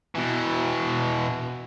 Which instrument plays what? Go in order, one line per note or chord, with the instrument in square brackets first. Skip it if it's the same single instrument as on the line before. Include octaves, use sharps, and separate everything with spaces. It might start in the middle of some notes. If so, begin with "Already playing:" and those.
[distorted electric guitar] B2 E3